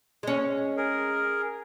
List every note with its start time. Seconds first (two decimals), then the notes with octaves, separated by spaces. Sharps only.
0.23 G#3 C#4
0.77 G#4 A#4